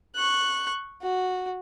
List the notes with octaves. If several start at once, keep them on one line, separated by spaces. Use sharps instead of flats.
C#6 F#6
F#4